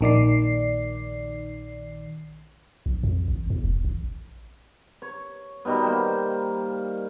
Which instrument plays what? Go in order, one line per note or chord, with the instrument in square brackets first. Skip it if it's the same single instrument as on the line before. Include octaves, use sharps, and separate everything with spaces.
[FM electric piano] A#1 D#3 D5 C7
[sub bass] A#1
F2
A1
E2
E1
A1
[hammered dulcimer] C#5
B2 D#3 G3 B3
A#3 C5